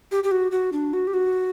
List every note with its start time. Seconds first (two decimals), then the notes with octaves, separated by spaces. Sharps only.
0.12 G4
0.24 G4
0.31 F#4
0.51 F#4
0.73 D4
0.93 F#4
1.07 G4
1.14 F#4